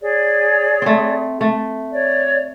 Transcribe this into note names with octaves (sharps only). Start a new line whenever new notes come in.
G#4 C#5 D5
A3 C4
A3
C#5 D5